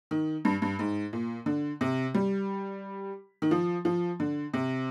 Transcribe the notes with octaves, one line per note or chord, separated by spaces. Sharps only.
D#3
G2
G2
G#2
A#2
D3
C3
G3
D#3
F3
F3
D3
C3